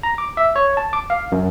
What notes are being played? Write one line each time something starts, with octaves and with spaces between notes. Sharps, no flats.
A#5
D6
E5
C#5
A5
D6
F5
F#2